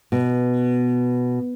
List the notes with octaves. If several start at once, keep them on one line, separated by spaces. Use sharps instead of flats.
B2